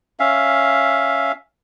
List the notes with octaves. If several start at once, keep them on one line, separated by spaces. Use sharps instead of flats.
C#4 E5 F5